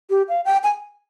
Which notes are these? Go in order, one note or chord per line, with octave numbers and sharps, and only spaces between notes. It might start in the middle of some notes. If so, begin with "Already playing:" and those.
G4
F5
G5
G#5